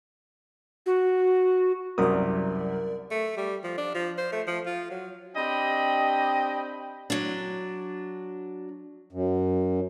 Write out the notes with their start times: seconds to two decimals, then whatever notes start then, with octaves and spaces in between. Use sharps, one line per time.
0.86 F#4
1.98 C2 F#2 A#4 D5 D#6
3.11 A3
3.37 G3
3.64 F3
3.78 D4
3.94 F3
4.18 C5
4.32 A3
4.47 F3
4.66 F4
4.90 F#3
5.36 C4 D4 G4 D#5 G5 B5
7.10 F#3 D4
9.13 F#2